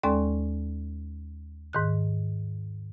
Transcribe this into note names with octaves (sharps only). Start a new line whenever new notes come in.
D#2 G#3 C#4 A4 D5 C6
G#2 D#3 F#6